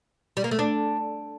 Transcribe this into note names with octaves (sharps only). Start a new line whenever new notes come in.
G3
A#3
A3
D4